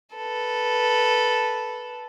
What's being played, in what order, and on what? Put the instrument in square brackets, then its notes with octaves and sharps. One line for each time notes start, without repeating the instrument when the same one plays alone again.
[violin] A4 B4